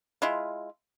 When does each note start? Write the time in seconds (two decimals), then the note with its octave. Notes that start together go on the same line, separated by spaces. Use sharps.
0.22 G#3 E4 F4